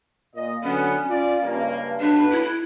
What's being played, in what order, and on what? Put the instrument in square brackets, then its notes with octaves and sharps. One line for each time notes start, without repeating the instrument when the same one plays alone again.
[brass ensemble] A#2 D#5
[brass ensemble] D3 F#3 B3 [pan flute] C#4
[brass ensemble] F4 D5
C#2 G2 A#3
[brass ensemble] B1 B4 [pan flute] D4
[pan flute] E4